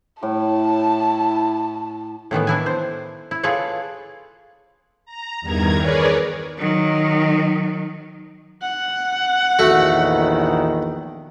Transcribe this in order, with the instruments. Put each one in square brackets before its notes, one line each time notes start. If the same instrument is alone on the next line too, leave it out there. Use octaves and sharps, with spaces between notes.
[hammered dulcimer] A2 [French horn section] E4 [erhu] A5
[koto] A2 D#3 E3 B3
D4 E4 G#5
C5
E4
F4 G#4 A4 B4 C#5 D5
[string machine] A#5
E2 G2 D#3 A#5 G#6
G#4 A#4 B4 C#5 D5
[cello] D#3 F#3
[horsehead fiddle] F#5
[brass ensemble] A#1 E2 D#3 [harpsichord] A3 F#4